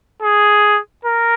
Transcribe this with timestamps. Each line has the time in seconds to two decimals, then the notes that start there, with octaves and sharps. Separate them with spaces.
0.22 G#4
1.05 A#4